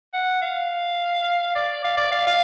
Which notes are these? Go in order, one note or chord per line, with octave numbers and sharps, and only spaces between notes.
F#5
F5
D5
F5
D5
F5
F5